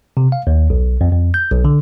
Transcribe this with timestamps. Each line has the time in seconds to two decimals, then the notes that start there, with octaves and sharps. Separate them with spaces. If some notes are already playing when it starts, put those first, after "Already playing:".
0.17 C3
0.32 F5
0.47 D#2
0.70 B1
1.01 F2
1.13 F2
1.34 G6
1.51 B1
1.65 D3